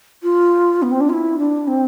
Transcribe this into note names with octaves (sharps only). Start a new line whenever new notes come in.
F4
B3
C4
D4
F4
E4
D4
C4